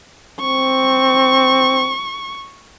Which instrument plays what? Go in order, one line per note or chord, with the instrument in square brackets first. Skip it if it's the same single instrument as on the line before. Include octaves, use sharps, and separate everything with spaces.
[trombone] C4 [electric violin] C#6